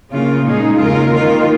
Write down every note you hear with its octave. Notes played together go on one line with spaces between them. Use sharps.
C#3 A#3 F4
A#2 G#3 D#4 G#4
D#2 C#3 G#3 F4 A#4
D#3 A#3 F4